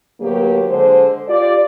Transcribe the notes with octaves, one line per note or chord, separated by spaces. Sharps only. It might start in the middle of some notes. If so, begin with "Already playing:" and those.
D2 F#3 A#3 B3 G4
D3 G#3 C5
F4 G4 D5